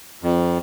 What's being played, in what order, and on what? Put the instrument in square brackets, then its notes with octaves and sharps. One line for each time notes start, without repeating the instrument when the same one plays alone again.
[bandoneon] F2